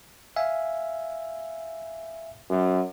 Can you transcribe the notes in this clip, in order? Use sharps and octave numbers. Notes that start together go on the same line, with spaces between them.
E5 F5 G#5
F#2